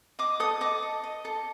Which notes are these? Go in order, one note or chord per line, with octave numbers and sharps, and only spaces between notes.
D#5 D6
A4 D#6
D#5 D6
A4
D#5
A4